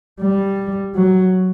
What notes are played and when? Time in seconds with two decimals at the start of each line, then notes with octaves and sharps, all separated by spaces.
0.20 G3
0.95 F#3